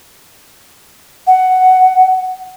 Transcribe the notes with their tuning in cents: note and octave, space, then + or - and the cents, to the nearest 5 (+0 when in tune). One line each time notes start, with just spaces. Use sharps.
F#5 +10